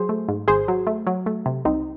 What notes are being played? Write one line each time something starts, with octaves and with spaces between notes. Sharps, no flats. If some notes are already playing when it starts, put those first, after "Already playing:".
Already playing: F#3 G#4 C5
A3
G#2
G#1 G#4 C5
F#3
A3
F#3
A3
C3
C2 C4 D#4